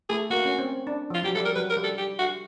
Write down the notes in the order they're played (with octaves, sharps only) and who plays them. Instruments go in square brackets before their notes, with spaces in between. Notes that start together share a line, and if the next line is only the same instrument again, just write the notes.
[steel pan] A3 [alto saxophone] G#4
[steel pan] A#3 [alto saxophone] F#4
[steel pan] C#4
C4
D4
[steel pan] F3 [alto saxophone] F4
[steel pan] F#3 [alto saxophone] G4
[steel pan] G3 [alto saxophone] A4
[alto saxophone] A#4
[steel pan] F#3 [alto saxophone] B4
[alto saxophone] A#4
[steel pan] G3
[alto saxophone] A4
G4
F#4